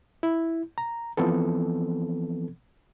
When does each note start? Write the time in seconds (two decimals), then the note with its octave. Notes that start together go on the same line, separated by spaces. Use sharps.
0.23 E4
0.78 A#5
1.17 E3 F3 B3 C4 A4